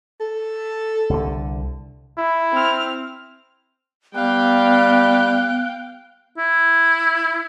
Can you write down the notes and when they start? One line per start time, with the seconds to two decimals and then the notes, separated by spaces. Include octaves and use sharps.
0.20 A4
1.10 C2 D3
2.18 E4
2.53 C4 F6
4.15 G3 B3 F5 G5 F#6
6.38 E4